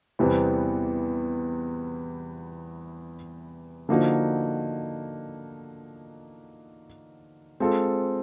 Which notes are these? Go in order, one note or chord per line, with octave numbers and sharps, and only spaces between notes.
E2 C3 E3 G3 B3
D3 F3 A#3 D#4 F#4
G#3 C4 F4 A4